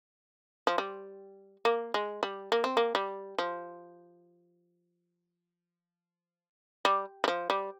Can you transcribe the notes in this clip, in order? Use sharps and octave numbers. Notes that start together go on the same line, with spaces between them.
F3
G3
A#3
G#3
G3
A#3
C4
A#3
G3
F3
G3
G3
F3
G3